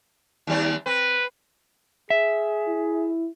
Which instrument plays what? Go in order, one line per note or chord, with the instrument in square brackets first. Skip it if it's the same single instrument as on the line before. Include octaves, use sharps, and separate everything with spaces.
[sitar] D#2 G3 C4
[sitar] C4 [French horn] B4
[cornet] G#4 [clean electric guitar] E5
[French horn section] E4